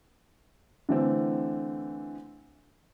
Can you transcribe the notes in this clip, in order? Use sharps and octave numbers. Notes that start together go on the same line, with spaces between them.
D3 E3 A3 C4